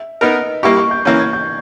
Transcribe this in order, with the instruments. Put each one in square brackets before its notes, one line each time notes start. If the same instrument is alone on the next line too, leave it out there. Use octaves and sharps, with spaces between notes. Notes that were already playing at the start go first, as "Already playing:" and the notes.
Already playing: [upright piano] E5
[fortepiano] B3 D#4 A#4 [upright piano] D#5
[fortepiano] G3 A#3 E4 G4 [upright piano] C#6
[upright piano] C#6
G6
[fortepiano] E3 A#3 C#4 [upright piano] G6
[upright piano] G#6
G6